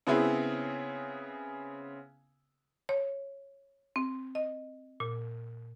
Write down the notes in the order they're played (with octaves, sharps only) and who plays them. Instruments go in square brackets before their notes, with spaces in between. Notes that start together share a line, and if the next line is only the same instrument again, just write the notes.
[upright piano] C#3 B3 C4 E4 G#4
[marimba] C#5
C4
D#5
A#2